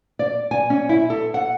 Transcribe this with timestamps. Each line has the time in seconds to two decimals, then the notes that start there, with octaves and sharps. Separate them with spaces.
0.19 D5
0.51 G#5
0.70 C#4
0.89 E4
1.10 A4
1.34 F#5